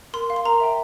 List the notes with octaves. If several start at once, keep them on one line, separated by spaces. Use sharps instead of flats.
A#4 C6
F5
C6
A#4 A#5
E5 G5